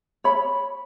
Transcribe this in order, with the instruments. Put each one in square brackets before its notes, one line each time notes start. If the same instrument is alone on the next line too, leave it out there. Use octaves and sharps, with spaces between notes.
[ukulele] C#5 B5